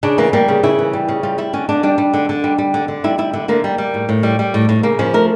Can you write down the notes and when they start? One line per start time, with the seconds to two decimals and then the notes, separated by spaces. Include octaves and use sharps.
0.03 C#3 D4
0.18 E3 A#3
0.33 G3 A#3
0.48 C#3
0.63 C#3 E4
0.79 E3
0.93 G3
1.09 C#3
1.23 G3 F4
1.38 G3 E4
1.53 D3 C#4
1.69 D3 D4
1.83 G3 D4
1.98 G3
2.14 D3
2.29 D3
2.44 G3
2.58 G3
2.74 D3
2.88 D3
3.04 G3 E4
3.18 G3 E4
3.33 D3 E4
3.48 D3 A#3
3.64 G3
3.78 G3
3.94 A2
4.09 A2
4.23 G3
4.39 G3
4.54 A2
4.69 A2
4.83 C#3 A#3
4.99 F3 C#4
5.14 A3 A#4